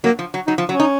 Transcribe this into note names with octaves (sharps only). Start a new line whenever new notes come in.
F#3 A#3
F3
F#3
F#3 D#4
F3
F#3 C#4
D#4